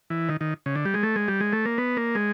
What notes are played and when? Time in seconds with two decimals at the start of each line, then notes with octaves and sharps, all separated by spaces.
0.10 E3
0.29 D#3
0.41 D#3
0.66 C#3
0.76 D3
0.85 G3
0.94 G#3
1.03 A3
1.16 G#3
1.28 G3
1.40 G#3
1.53 A3
1.66 A#3
1.78 B3
1.97 A#3
2.15 G#3